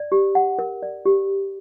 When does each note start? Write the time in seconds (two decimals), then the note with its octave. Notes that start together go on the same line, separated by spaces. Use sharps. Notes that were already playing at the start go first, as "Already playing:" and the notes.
Already playing: D5
0.12 G4
0.35 F#5
0.59 A#4
0.83 D5
1.06 G4